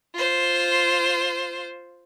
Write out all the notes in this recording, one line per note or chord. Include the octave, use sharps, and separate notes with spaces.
F4 C5